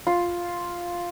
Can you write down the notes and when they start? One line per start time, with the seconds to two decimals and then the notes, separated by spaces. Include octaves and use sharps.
0.07 F4